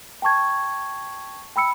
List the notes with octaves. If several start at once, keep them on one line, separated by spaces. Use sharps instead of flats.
G5 A5 C#6 G#6
G5 B5 E6 C#7